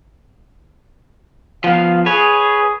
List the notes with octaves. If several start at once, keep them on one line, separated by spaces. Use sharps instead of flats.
F3 B3 F5
G#4 B4 C#5